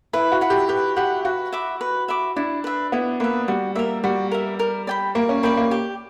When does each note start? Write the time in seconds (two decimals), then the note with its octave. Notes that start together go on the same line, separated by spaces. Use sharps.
0.13 E4 B4
0.32 F#4
0.41 F#5 B5
0.50 G4
0.69 G4 B4
0.97 G4 F#5 B5
1.25 F#4 B4
1.53 E5 B5 D6
1.81 B4
2.08 E5 B5 D6
2.36 D4 E4
2.64 B4 E5
2.92 B3 E4
3.20 A#3 B4 E5
3.48 G3 F#4
3.75 A#3 A#4 E5
4.04 G3 F#4
4.32 A#4 E5
4.59 A#4
4.87 D5 G5 B5
5.15 A#3 A#4
5.29 C#4
5.43 A#3 D5 G5 B5
5.57 A#3
5.71 G4